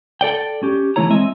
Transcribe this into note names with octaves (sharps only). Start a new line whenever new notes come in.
A4 D5 G5
C#4 G4
E3 F#3 A3 E4 C#5 A#5
G#3 C4 D#5 E5